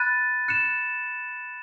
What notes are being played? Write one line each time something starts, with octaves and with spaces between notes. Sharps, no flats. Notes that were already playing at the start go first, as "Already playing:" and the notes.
Already playing: B5 F#6 A6 D#7
F#6 C#7 E7